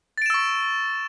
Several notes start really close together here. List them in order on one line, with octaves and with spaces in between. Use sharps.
A6 D7 E7 E6 C#6